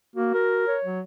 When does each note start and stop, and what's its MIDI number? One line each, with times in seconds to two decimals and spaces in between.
0.16 0.33 58
0.16 0.65 66
0.34 0.76 70
0.67 1.01 73
0.85 1.01 54